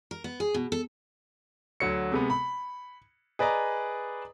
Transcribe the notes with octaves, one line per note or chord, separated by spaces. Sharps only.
A#4
B3
G#4
B2
A4
D2 F#3 C#7
C3 G#3 B3
B5
G#4 B4 D5 D#5 A#5